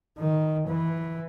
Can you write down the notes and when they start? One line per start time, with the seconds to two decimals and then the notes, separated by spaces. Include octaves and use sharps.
0.19 D#3
0.68 E3